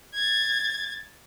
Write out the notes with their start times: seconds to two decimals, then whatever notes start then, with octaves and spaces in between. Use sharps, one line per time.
0.14 G#6 A6